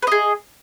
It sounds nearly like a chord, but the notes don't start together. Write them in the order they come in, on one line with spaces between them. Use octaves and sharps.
B4 D#5 G#4